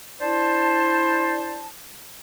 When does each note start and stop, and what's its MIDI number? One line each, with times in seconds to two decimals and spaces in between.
0.21 1.66 62
0.21 1.66 64
0.21 1.66 72
0.21 1.66 81